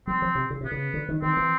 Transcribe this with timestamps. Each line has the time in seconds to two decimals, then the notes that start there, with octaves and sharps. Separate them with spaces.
0.07 F#3 C4
0.22 F3
0.35 C3
0.50 C#3
0.61 C3 B3
0.71 C#3
0.94 D3
1.09 D#3
1.22 D#3 C4
1.37 E3